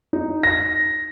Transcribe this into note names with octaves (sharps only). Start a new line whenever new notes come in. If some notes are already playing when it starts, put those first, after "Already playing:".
D#4
A#6